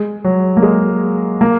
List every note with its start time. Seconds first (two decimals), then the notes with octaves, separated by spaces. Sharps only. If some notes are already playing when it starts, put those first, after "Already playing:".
Already playing: G#3
0.24 F#3
0.57 A#3
0.63 G#3
1.41 A#3